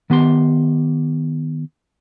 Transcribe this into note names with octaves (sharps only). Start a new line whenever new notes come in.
D#3 B3 G4 C6